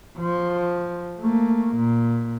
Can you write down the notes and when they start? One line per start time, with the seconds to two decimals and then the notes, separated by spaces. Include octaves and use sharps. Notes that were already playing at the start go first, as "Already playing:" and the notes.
0.19 F3
1.21 A3 A#3
1.76 A#2